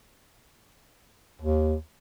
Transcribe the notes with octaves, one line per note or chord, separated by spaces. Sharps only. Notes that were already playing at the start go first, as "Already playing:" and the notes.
D#2